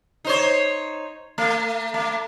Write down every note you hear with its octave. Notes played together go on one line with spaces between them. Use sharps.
D#4 C5 C#5
A3
A3